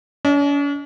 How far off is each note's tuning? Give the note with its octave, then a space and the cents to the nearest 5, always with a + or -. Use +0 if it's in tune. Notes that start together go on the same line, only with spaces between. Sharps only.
C#4 +45 D#5 +0